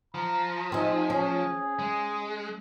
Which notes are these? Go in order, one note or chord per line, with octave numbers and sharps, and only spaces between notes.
F3 A#5
C4 D#4 G#4
C#4
G#3